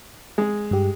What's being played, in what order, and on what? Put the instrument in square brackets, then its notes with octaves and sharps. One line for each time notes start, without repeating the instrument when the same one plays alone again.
[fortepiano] G#3
[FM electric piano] G2 G4